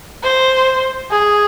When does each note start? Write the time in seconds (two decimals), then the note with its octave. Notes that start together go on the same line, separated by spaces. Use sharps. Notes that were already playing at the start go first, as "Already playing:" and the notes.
0.23 C5
1.11 G#4